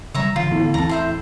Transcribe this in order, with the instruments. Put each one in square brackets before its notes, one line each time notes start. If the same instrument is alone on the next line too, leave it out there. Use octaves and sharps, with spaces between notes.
[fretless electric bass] C#3 F#3 G3 [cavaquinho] C#5 E5 A#5
[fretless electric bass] D3 E3 [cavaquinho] F4
[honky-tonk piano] A2 [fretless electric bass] D3 E3 B3
[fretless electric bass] D#2 E3 C4 [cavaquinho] A5 A#5
[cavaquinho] C5 E5 C6